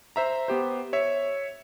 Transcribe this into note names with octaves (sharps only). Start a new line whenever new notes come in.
C5 E5 A#5
B3 G4 C5
C#5 E5